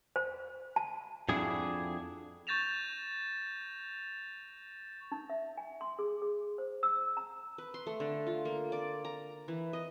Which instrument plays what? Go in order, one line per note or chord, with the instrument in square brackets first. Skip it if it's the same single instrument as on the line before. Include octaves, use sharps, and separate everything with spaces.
[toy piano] C5
A5
[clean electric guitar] F2 G#4 [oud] D4 E4 F#4
[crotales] C#6 G6 A6 A#6 E7 F7
[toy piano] D#4
E5
G#5
C6
G#4
G#4
C5
E6
A#5
[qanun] B4
C6
A3
D3
F4
A#3
D5
A#5
E3
D#5